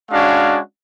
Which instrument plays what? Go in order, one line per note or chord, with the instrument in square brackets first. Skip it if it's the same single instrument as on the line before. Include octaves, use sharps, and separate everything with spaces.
[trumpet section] G#3 C#4 D4 F#4 F5